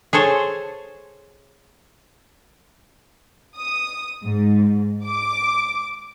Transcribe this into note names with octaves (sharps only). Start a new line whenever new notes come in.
G#4 A4 C5 C#5
D#6
G#2
D6